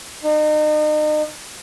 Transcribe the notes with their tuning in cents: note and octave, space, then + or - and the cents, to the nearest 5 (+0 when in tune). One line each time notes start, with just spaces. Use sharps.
D#4 -35